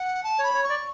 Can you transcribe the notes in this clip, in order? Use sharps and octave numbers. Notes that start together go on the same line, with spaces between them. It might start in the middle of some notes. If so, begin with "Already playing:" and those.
Already playing: F#5
A5
C#5 B5
C#5
C#6
D5